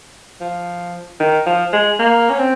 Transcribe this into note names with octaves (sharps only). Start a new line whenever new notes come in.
F3
D#3
F3
G#3
A#3
C#4
C4